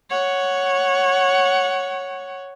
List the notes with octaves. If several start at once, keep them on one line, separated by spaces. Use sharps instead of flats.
C#5 F#5